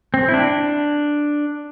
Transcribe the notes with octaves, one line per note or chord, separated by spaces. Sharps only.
C4
E4
D4